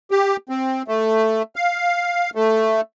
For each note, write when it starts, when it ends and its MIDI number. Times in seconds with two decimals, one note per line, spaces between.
0.11 0.36 67
0.49 0.82 60
0.88 1.42 57
1.56 2.30 77
2.35 2.81 57